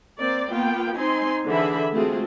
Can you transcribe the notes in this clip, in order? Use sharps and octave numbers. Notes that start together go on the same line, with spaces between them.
A#3 C4 D5
A#3 B3 F4 G5
C4 D#4 G#5 C6
D3 E3 G#4 E5 B5
G#3 A3 C4 F4 F#4 G#4